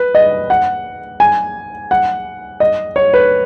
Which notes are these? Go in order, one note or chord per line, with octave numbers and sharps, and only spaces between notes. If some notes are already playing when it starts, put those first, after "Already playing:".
Already playing: B4
D#5
F#5
G#5
F#5
D#5
C#5
B4